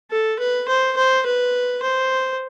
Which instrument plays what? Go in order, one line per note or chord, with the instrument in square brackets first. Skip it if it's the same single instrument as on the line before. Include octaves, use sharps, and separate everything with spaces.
[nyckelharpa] A4
B4
C5
C5
B4
C5